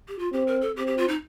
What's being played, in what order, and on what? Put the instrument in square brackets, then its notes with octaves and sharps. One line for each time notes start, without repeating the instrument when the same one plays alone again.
[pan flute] G4
F4
[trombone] C4 [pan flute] G4
[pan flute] A#4
A4
[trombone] C4 [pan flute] G4
[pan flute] G4
F4
D#4